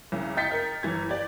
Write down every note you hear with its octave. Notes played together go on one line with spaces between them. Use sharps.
C2 C#3
D#5 G5 G6 A6 B6 C#7
A#4
G1 E3 G#6
G4 D5